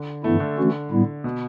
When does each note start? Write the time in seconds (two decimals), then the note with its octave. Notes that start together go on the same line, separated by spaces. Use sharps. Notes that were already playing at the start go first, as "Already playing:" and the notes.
Already playing: D3
0.24 G2 E3 A3 B3 E4
0.40 D3
0.57 E3 A3 C#4 F#4
0.91 A2 G3 B3 E4
1.24 B2